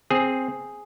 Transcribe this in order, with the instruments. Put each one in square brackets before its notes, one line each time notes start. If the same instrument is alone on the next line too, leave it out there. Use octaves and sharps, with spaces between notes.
[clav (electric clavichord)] C4 G#4